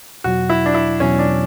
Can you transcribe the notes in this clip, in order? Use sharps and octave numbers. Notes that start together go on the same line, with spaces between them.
E2 B2 F#3 F#4
E4
D4
E4
E2 B2 F#3 C#4
D4